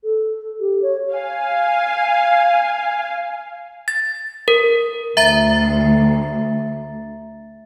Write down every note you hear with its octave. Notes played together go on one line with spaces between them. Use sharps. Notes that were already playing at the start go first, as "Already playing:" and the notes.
A4
G4
C#5
F5 G#5
A6
A#4
D2 E5 A#5 A6